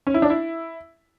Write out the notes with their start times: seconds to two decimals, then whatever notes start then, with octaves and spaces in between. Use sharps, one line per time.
0.07 C#4
0.14 E4
0.22 D4
0.30 E4